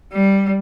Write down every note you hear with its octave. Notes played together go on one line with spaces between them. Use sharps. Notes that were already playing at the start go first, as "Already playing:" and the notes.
G3